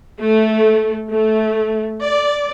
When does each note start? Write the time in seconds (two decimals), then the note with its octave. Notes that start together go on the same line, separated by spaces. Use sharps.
0.18 A3
1.08 A3
2.02 D5